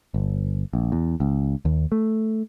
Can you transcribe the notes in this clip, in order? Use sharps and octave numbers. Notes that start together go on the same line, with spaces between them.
G1
A#1
E2
C#2
D#2
A3